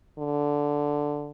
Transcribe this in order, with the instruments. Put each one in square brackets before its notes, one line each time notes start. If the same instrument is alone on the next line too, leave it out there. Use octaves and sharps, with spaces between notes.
[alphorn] D3